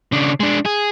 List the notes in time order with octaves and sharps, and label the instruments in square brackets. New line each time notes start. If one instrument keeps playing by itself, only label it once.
[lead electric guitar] C#3 D4
G#3 D4
G#4